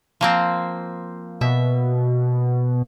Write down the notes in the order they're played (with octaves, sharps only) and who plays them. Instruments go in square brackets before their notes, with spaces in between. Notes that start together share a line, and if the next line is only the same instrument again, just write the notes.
[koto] F3 A#3 C4
[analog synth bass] B2 [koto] E5